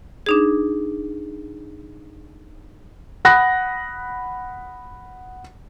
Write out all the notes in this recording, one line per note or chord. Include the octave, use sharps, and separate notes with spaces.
D4 D#4 G#4
F#5 B5 D#6 F#6 A#6